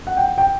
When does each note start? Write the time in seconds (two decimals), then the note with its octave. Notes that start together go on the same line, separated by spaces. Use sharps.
0.07 F#5
0.17 G5
0.38 G5